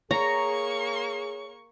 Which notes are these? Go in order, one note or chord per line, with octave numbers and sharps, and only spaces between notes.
A#3 G#4 C#5 A#5 C#6